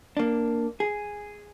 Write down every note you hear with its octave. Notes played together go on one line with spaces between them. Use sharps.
A#3 D4
G#4